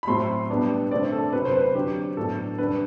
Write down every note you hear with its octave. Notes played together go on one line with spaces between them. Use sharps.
B5
A2 F#3 A3 C4 C6
B2 G3 B3 D4
D3 A3 C4 D5
A4
C3 F#3 C4 B4
C5
B4
D3 F#3 C4 G4
A2 F#3 B3 D4 A4
D3 G3 D4 B4